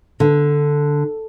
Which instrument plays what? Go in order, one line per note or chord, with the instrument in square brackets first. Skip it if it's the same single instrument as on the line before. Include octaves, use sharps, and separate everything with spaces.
[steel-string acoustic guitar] D3